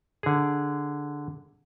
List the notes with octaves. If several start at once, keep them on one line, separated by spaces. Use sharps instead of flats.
D3 G#4